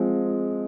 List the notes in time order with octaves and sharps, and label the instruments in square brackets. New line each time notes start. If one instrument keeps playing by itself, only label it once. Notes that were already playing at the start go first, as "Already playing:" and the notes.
Already playing: [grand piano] F3 G#3 C4